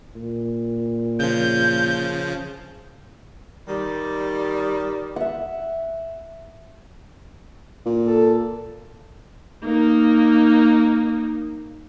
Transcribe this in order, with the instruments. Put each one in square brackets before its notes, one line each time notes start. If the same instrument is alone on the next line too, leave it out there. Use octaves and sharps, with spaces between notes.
[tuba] A#2
[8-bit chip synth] C#3 F3 [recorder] G6
[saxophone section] D#3 G3
[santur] E5 F#5
[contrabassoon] A#2
[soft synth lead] A4
[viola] A#3 D#4